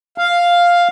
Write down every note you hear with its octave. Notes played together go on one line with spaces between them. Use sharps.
F5